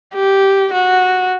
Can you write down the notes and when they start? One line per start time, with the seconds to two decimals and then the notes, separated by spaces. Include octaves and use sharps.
0.14 G4
0.73 F#4